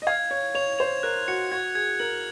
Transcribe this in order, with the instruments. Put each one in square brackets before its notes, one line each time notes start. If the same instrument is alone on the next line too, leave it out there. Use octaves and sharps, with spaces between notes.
[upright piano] D#5
[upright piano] F5 [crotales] G#6
[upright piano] C#5 [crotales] G#6
[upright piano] C#5 [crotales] F7
[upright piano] C5 [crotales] F7
[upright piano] A#4 [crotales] F#6
[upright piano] F#4 [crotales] C#7
[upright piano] F#4 [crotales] G#6
[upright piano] G#4 [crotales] G#6
[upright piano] A#4 [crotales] F#7